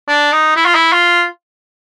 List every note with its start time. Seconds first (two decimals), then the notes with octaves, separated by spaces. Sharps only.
0.08 D4
0.32 D#4
0.56 E4
0.65 F4
0.75 E4
0.92 F4